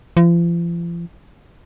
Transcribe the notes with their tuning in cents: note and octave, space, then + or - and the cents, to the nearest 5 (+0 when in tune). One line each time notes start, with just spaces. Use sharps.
F3 -40